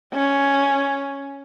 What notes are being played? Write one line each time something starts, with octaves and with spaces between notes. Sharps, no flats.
C#4